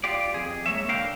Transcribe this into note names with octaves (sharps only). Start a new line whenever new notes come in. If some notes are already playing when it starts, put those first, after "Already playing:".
F4 G4 D5
F2 G#4
G#3 A#3 C#5 E5
D3 A#4 F5 G5